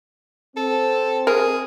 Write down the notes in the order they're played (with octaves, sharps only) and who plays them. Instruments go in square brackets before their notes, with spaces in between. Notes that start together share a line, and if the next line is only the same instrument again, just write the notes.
[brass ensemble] C4 [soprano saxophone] A4
[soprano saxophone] G#4 [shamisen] A#4